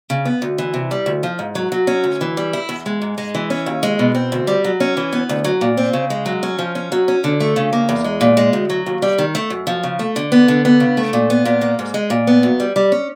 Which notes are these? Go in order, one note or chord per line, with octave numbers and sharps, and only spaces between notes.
C#3
B3
D2
E3
C3
G3
D2
F3
G#2
F#3
F#3
C#4
D2
E3
G3
E4
E2
G#3
G#2
G#3
E3
C#4
D#2
G#3
B2
C4
D2
G3
F#3
C#4
E3
B3
D2
F#3
A#2
C4
C#3
G#3
F#3
C#4
F3
C#4
F#3
C#4
D3
A3
C#3
A#3
E2
G#3
A#2
G#3
D2
F#3
D#2
G3
D#3
A3
F#2
F3
C#3
A3
D3
B3
D3
B3
C#3
A3
A#2
B3
A#2
A#3
G#2
G#3
A#2
B3
F#2
G3
G3
C#4